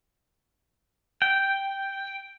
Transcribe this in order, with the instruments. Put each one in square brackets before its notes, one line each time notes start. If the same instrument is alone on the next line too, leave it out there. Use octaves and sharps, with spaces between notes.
[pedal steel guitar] G5